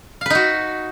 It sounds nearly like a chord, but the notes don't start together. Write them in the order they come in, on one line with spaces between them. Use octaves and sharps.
F5 B4 D#4 F#4